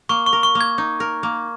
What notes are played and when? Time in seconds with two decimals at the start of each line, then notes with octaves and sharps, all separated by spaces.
0.09 A#3 C#6
0.26 C#6
0.33 A#4
0.43 C#6
0.55 A#3
0.61 G#6
0.78 D#4
1.00 A#4
1.23 A#3